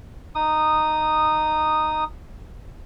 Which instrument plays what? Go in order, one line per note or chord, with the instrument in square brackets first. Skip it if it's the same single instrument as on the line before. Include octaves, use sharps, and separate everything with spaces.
[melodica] D#4 D#6